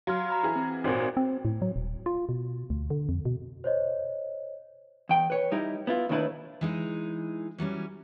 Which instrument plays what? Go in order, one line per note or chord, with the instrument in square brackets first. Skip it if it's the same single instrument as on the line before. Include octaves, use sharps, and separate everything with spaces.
[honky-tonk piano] F#3 [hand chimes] F5 C6 F6
[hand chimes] A#5 B5 F6
[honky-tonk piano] E3 E4 G#4
[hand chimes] C4
[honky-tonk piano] G#1 A#2 [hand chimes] F#4 C5 C#5
[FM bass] C4
A2
F#3
D#1
F4
B2
D2
D3
F2
B2
[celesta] C5 C#5 D#5
[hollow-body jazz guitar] E2 G5
B4 C#5
G3 D#4 E4
B3 E4 F4
D#2 A2 A3 D4 E4 B4
[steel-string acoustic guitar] E3 G#3 D#4
E3 F#3 G3 C#4